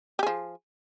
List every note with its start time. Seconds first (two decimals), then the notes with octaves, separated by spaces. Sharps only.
0.19 G4
0.23 G#4
0.27 F3